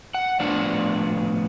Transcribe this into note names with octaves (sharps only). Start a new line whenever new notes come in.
F#5
A2 F3 B3 D4 D5